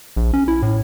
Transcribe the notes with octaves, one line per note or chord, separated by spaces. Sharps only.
A#1
C#4
E4
A2